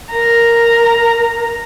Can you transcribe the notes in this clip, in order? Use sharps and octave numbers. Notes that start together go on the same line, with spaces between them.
A#4 A#5